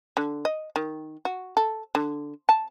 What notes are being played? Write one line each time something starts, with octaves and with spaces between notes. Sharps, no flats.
D3
D#5
D#3
F#4
A4
D3
A5